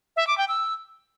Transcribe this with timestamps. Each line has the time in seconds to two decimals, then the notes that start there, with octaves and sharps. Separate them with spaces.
0.16 E5
0.27 D6
0.38 G5
0.48 E6